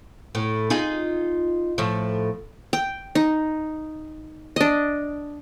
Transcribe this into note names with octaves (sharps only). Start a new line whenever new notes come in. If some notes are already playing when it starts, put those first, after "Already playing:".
A2
D#4 F4 G#4
A2 F3
G5
D#4
D4 D#5